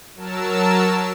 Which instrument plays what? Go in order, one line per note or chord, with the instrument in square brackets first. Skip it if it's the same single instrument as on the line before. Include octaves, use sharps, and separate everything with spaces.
[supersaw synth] F#3 A#4 A5 E6